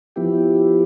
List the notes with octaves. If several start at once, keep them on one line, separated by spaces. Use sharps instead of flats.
F3 B3 E4 G4